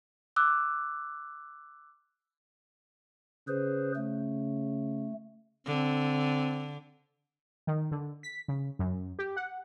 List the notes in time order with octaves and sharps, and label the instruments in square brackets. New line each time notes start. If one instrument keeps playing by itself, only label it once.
[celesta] D6 E6 F#6
[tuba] C#3 [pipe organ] G#4 B4 C5
[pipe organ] A3
[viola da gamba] D3 [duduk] C4
[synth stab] D#3
D3
B6
C#3
F#2
G4
F#5